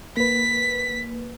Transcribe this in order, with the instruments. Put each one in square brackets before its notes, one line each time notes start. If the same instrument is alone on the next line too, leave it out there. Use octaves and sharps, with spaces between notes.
[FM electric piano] A#3 B4 [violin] B6